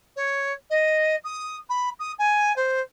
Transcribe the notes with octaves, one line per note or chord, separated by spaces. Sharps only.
C#5
D#5
D#6
B5
D#6
G#5
C5